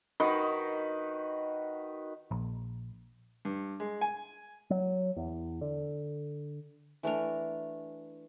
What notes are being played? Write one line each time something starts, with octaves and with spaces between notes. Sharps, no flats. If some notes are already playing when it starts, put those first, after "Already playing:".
D#3 D#4 F#4 B4
A#1
G2
G#3
G#5
F#3
E2
D3
E3 A3 D4 A#4